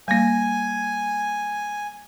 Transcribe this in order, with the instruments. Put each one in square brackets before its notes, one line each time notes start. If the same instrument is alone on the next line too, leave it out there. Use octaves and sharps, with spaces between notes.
[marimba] G3 A#3 [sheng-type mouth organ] G#5